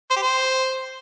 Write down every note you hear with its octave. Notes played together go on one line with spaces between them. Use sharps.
C5
G4
C5